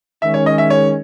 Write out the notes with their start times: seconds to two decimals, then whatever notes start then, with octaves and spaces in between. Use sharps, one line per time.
0.22 D#3 G#3 C#4 E5
0.34 C#5
0.46 D#5
0.58 E5
0.70 C#5